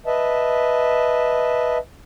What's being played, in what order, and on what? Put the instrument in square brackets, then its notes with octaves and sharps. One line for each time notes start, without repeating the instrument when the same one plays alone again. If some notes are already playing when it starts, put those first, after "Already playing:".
[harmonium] B4 D#5 E5 A5